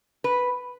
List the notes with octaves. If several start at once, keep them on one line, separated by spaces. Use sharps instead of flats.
B4